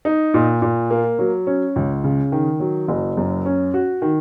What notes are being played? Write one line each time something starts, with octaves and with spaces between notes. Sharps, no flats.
D#4
A#2
A#2
A#3
F#3
C#4
C#2
C#3
D#3
F#3
F#1
F#2
C#4
F#4
D#3